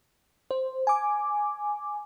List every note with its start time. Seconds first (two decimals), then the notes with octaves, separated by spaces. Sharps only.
0.51 C5
0.87 G#5 D6